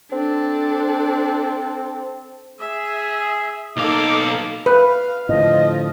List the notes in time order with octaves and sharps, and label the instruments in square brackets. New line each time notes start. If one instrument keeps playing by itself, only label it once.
[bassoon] C4 [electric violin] D4 A4
[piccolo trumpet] G#4 [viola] E5
[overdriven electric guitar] B1 F5 [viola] A#3 A4 [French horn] D#4 [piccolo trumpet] D6
[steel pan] B4 [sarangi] F5
[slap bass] A2 D3 [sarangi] F3 [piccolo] D#5